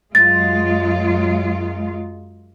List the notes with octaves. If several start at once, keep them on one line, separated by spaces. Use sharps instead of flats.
F#2 G#3 F4 A6